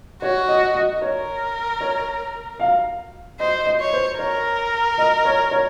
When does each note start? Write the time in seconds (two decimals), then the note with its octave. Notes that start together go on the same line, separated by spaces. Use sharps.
0.22 F#4 C#5
0.48 D#5
0.74 D#5
1.02 A#4 C#5
1.81 C#5
2.60 F5
3.39 C5 D#5
3.66 D#5
3.80 C#5
3.93 C5
4.19 A#4 C#5
4.98 D#5
5.25 C#5
5.51 C#5